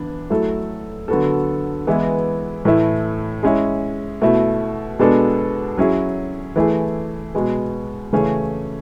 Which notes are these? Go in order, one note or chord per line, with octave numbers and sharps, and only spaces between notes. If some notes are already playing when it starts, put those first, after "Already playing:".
Already playing: E3 B3 D4
F#3 A3 E4 A4
D3 F#3 B3 F#4 A4
E3 G#3 B3 E4
A2 E3 A3 E4
G#3 C#4 E4
B2 A3 E4
B2 G#3 B3 D4 A4
F#3 C#4 E4 G#4
E3 A3 E4 G#4
B2 G#3 B3
C#3 E3 A3 C#4 G#4